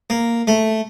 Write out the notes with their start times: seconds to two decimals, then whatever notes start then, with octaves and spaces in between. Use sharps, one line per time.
0.10 A#3
0.47 A3